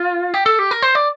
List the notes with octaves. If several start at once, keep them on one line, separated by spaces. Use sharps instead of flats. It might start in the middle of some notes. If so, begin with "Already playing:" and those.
Already playing: F4
G4
A4
G4
A#4
C5
D5